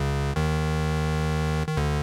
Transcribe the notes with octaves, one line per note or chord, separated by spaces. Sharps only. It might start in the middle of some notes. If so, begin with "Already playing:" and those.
Already playing: C#2 C#3
D#2 D#3
D#3
D2 D3